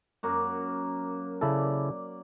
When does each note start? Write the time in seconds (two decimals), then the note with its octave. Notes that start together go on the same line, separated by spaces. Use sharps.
0.23 F#2 A#3 F#4
1.41 C#3 E4 A4 D5